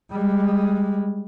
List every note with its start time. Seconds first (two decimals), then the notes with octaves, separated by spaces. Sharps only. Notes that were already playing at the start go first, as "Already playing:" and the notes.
0.12 G3 G#3